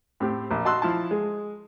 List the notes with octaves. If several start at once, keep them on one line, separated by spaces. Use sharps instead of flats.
A2 C4 G4
A#1
F#4 D#5 A5 C6 E6 F#6
F3 E4 A5
G#3